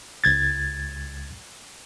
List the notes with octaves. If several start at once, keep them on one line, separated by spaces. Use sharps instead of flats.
C#2 G#6 A6